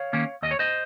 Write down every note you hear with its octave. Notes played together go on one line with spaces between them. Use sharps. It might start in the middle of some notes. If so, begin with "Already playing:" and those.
Already playing: C#5 F5
D#3 A#3 C#4
D#2 D#5
C#5
C5 D#5